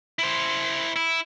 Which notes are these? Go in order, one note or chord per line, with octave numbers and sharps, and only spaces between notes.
E4 C5
E4